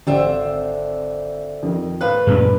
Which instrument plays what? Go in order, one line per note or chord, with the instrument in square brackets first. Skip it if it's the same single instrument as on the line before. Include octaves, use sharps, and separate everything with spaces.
[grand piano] G#1 [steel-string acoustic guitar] D3 C4 E5
[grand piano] F2 D#3
[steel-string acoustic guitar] A2 B4 [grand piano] F5 F#6
[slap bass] F#2 A#2 D4 [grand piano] G#3